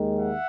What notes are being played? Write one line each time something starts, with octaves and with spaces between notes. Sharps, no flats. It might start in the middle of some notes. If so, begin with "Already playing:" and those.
Already playing: D#2 D#3 G#3
E5 F#5